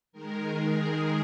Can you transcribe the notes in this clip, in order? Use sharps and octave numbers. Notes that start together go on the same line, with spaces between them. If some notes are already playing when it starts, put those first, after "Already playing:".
D#3 G#3 A#4
G#4